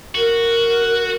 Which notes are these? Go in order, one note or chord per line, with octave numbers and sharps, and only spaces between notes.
F#4 A#4